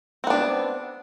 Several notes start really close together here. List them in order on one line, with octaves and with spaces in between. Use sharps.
C4 B3 D4